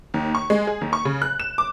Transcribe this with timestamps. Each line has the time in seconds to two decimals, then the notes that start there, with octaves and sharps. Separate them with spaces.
0.14 D#2
0.35 C#6
0.50 G#3
0.67 G#4
0.81 D#2
0.93 C#6
1.05 C#3
1.22 F#6
1.40 E7
1.58 D6